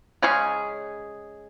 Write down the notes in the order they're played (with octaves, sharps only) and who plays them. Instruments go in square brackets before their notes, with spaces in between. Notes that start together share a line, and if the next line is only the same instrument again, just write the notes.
[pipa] C#3 G#3 C#4 G#4